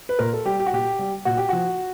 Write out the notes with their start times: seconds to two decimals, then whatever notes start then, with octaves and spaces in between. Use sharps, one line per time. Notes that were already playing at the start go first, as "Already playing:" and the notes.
0.09 B4
0.19 A#2 A#4
0.33 A4
0.45 G3 G4
0.59 G4
0.66 F#4
0.73 A#2 G4
0.99 G3
1.25 A#2 F#4
1.37 G4
1.49 F3 F#4